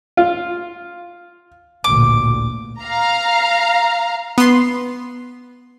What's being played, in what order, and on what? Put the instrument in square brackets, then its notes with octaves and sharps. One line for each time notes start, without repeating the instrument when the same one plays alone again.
[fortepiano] F4
[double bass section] A1 D2 A#2 [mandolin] D6
[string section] F5 A#5
[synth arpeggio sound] B3 C6